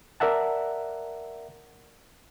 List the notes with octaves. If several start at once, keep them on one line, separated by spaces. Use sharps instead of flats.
A#4 D5 E5 F#5 A5